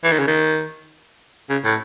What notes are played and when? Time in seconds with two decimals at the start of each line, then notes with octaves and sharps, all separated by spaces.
0.04 E3
0.11 D#3
0.19 C#3
0.27 D#3
1.49 C#3
1.64 A2